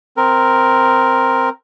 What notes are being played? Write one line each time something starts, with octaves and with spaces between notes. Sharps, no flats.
C4 A#4